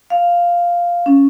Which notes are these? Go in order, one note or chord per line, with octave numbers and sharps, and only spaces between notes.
F5
C#4